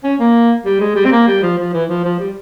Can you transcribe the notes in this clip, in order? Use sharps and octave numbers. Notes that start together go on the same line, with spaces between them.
C#4
A#3
G3
G#3
G3
C4
A#3
G3
F3
F3
E3
F3
F3
G3